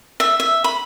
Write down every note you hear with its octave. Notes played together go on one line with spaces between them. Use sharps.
E5
E5
B5